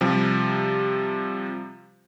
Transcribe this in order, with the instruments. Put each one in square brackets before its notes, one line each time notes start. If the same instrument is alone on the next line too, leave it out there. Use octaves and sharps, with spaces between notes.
[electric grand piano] C3 F3 G3